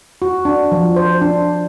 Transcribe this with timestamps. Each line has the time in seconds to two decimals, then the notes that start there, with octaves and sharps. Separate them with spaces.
0.22 F#4
0.45 D4
0.72 F3
0.96 C5
1.21 D4